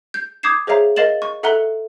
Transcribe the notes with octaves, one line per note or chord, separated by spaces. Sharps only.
G6
D6 D#6 G6 G#6 C7 E7
G#4 C5 C#5 E5 F5 A#5
A#4 D#5 F5 A6 E7 F#7
C#6
A4 E5 F#5 A#5 F#6 G7